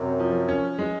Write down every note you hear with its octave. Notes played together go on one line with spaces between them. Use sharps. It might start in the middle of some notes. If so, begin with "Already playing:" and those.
Already playing: F#2 C3
F3
C#4
G#3